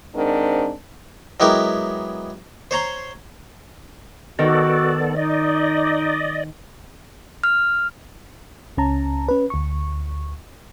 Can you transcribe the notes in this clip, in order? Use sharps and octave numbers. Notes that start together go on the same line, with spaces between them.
G#2 D#3 C4 D4
F#3 G#3 B3 E4 G4 A#4
C5 C#5 A#5 C6
D#3 B3 F#4 A4 D5
D#4 D5 D#5
F6
C#2 C#4 A5 A#5
C#4 B4
D2 C#6